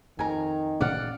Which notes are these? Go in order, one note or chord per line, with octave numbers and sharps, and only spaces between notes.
F2 D#3 G#5 A#5
A1 A#2 C#4 D5 F5 F#5